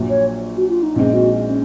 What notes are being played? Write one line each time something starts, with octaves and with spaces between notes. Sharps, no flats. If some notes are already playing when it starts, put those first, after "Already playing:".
Already playing: A#1 A#2 F#3
C#5
F#4
F4
D#4
A#1 A#2 G#3 C4 C#4 D#4
F#4
C#4